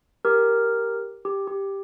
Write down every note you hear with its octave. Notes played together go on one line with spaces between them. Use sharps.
G4 A#4
G4
G4